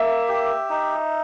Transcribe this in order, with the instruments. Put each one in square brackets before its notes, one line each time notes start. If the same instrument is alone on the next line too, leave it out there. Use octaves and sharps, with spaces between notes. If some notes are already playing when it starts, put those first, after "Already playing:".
Already playing: [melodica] A#3 [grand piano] E5
[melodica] G4
D#4